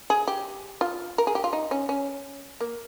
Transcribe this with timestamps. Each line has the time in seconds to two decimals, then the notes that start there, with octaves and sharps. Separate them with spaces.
0.10 G#4
0.28 G4
0.81 F4
1.18 A#4
1.27 G#4
1.35 G4
1.44 F4
1.53 D#4
1.71 C#4
1.89 C#4
2.60 A#3